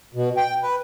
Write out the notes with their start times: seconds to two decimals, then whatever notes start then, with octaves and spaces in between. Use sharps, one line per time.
0.14 B2
0.37 G5
0.63 B4